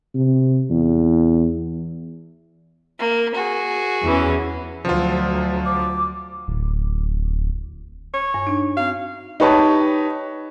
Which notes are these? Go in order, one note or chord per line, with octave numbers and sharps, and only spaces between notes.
C3
E2
A#3
F#4 G#4
E2 E3 C#4
D2 F3 F#3 F4
D6
D1
C#5
G2
D4 D#4
C4 F#4 F5
D#4 G4 B4 C#5 A5 C#6